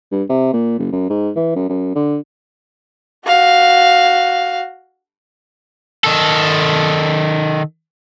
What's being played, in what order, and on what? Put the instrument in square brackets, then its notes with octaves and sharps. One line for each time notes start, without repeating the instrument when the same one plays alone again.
[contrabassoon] G2
C3
A#2
F#1
F#2
G#2
E3
F#2
F#2
D3
[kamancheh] F#4 F5
[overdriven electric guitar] D#3 A4